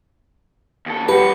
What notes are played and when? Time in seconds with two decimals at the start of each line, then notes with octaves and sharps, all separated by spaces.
0.86 D#2 A4
1.09 G2 F#4 G4 B4